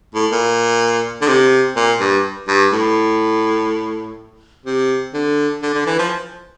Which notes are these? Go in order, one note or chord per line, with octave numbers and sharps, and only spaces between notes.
A2
A#2
D3
C3
A#2
G2
G2
A2
C3
D3
D3
D3
E3
F3